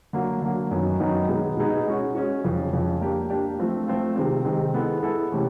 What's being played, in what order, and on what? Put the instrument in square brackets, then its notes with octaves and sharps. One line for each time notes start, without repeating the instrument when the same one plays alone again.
[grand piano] D3 F#3 A#3
D3 F#3 A#3
F#2 D#3 F#3 B3 D#4
F#2 D#3 F#3 B3 D#4
B2 G#3 B3 D#4 G#4
B2 G#3 B3 D#4 G#4
G#3 C#4 F#4
G#3 C#4 F#4
F2 C#3 F3
F2 C#3 F3
A#3 D4 G4
A#3 D4 G4
F3 A3 C4 F4
F3 A3 C4 F4
C3 D#3 G#3 C4
C3 D#3 G#3 C4
G#3 B3 E4 A4
G#3 B3 E4 A4
C3 E3 A3 C#4